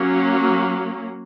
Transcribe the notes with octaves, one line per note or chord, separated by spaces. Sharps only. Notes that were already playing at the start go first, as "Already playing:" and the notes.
Already playing: F#3 A#3 C#4